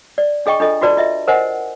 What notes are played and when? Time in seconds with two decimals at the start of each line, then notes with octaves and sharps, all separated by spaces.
0.18 D5
0.46 D4 G#4 D#5 G5 C#6
0.60 D4 F4 A4 D#5
0.82 F4 F#4 B4 D5 A5
0.97 F4 D#5 E5
1.28 A#4 C5 D#5 F#5 G#5